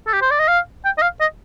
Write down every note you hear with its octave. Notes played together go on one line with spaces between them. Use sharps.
A4
G4
C5
D5
D#5
F5
G5
D#5
F5
D#5